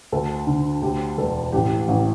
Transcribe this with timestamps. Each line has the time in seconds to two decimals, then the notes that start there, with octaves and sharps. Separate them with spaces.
0.12 D2 A4
0.47 D3
0.82 D2 G4
1.18 E1 A4
1.53 A1 G4
1.88 A1